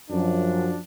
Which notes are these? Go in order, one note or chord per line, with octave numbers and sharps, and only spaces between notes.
F#2 F3 D4